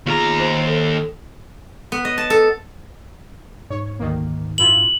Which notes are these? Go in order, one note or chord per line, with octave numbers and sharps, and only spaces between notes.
D#2 B3 F4 G#4 A#5
C5
G5
A4
B3
D#5
A5
A4
G#2 C#5
D2 D#3 A#3
F#2 E4 F4 F#7